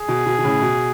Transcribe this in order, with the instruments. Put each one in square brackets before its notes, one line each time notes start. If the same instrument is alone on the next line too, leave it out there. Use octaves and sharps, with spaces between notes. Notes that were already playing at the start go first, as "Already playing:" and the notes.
Already playing: [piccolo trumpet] G#4
[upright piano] B2
B2
B2
A2 C#3
B2